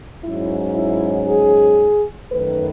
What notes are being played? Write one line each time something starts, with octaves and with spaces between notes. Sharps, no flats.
G#2 F#3 C#4 E4
E4
G#4
F#2 D#3 A3 B4